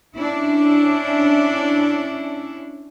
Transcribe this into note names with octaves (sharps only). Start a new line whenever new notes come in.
C#4 D4 E4